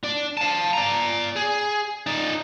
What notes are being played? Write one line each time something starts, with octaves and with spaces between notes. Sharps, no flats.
D4 D5
F5 A5
D5 A#5
G#4
D#4 D5